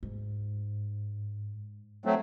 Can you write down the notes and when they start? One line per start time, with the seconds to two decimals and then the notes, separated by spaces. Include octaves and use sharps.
0.03 G#2
2.05 F#3 A3 C4